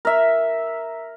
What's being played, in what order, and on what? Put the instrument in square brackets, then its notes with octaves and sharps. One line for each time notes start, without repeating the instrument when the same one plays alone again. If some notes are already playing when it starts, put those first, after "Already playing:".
[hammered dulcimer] A#4 E5